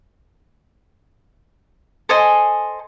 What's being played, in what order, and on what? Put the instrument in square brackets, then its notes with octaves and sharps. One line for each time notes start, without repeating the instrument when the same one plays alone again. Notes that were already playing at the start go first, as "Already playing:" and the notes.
[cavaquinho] A4 C5 D#5 G#5